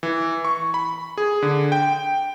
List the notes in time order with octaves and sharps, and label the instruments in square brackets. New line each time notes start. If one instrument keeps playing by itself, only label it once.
[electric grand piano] E3
C#6
B5
G#4
D3
G5